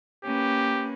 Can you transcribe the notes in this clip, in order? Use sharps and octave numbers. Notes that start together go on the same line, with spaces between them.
A#3 C#4 G4 B4